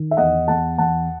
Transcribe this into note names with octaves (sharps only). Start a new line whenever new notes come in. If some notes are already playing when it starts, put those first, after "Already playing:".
Already playing: D#3
E5
E2 D#5 F#5
E2 F#5 A5
E2 F#5 A5